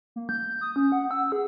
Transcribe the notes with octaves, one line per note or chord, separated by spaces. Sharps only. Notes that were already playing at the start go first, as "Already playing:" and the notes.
A#3
G6
D#6
C#4
F#5
E6
G#4